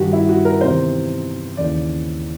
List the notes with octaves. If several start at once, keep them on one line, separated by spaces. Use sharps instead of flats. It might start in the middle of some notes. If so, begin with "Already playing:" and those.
Already playing: G2 D#3 F#4 G4
E4
F#4
A#4
E2 C3 D#3 C5
D#2 C#3 E3 D5